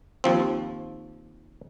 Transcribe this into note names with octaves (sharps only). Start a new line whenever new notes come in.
D#2 F3 C4